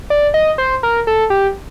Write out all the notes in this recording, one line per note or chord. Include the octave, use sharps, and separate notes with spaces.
D5
D#5
C5
A#4
A4
G4